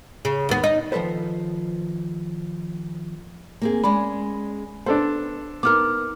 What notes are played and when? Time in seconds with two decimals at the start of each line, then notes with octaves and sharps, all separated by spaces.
0.25 C#3
0.49 D#2 B3
0.64 D#4
0.92 D#3 F3 C4 A4 B4 C5
3.62 A#3 C4 G#4
3.84 G#3 C#4 D5 B5
4.86 B3 D4 A4 C5
5.63 B3 D#4 A#4 D6 F6